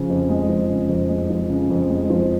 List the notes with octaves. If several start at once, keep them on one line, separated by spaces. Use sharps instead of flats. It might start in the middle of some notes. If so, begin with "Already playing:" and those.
Already playing: C#3 F3
F2
G#3
F3
C#3
F2
G#3
F3
C#3
F2
G#3
F3